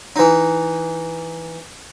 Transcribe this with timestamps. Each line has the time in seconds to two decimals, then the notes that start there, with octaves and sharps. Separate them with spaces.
0.16 E3 D#4